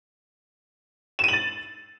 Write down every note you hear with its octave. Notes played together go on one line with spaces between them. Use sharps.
A6 D#7 E7 F#7